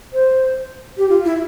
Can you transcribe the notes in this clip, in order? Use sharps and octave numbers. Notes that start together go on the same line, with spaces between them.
C5
G4
F4
E4